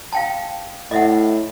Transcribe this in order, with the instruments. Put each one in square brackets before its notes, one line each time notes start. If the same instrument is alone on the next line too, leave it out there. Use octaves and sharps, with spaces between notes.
[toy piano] F5 G5 A5
[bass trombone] A2 [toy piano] D#5 E5 F#5